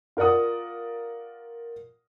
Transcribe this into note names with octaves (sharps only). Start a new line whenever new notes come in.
F4 A#4 D5 F#5 D#6